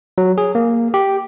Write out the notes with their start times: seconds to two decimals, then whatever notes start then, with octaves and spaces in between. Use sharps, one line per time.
0.18 F#3
0.38 G#4
0.55 A#3
0.94 G4